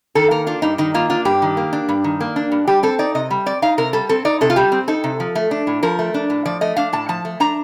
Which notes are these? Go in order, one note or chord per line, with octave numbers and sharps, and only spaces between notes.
D#3 A4
A#3 A#4
D4 F4
G2 D#4
D#3 D#4
A#3 F4
D4 F4
G2 G4
D#3
A#3
D4
G2
D#3
A#3
D4
G2
G3 G4
C4 A4
D#4 D5
C3 D#5
G3
C4 D5
D#4 F5
C3 A#4
G3 A4
C4 A4
D#4 D5
C3 A4
F4
G3 G4
C4
D#4 A4
C3
F3
A3
D4
A2
F3 A#4
A3
D4
A2
F3 D5
A3 D#5
D4 F5
A2 A5
F3 A5
A3
D4 A#5